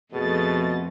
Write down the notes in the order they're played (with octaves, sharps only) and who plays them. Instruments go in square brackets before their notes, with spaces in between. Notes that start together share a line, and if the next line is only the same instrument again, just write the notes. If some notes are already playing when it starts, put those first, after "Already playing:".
[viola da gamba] F2 [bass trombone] B2 [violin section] A3 D#5 A6 [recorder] G#4